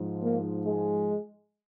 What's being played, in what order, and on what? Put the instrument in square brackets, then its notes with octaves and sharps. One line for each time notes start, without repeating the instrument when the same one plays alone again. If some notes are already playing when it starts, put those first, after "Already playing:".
Already playing: [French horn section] G#2 F3
A#3
G#3